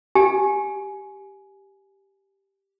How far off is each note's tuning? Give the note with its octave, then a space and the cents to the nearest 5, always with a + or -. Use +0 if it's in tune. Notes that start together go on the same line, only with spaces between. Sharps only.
G4 +0 G#5 +15